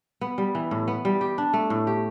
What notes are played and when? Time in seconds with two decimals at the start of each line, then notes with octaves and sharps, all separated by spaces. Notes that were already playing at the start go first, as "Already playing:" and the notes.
0.21 B3
0.38 G3
0.55 E3
0.71 A2
0.88 B3
1.05 G3
1.21 G4
1.38 D4
1.53 A3
1.70 A2
1.87 G4